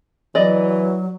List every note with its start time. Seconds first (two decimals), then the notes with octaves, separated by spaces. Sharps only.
0.35 E3 F#3 D5 D#5